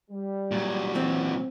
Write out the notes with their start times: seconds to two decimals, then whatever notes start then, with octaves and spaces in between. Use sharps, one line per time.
0.10 G3
0.51 A#2 F#3
0.96 E3 C4